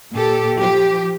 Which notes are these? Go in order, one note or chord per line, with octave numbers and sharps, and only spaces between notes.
A#2 G4 A4
F3 G4